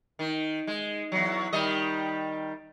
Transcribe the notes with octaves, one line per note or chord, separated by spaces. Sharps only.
D#3
G#3
E2 F#3
D#3 G3 D#5